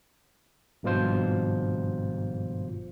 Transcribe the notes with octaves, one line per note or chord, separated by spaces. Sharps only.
G#1 G2 B2 F3 F4 C5